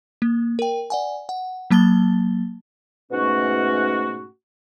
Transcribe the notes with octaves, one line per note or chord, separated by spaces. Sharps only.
A#3
A#4 G5
D5 F#5 G#5
F#5
F#3 A#3 A5 A6 G7
G#2 B2 A3 C#4 F#4